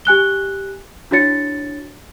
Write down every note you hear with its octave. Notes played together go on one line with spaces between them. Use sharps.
G4 G#5 F#6 G7
D4 E4 F#4 C#5 A6 C#7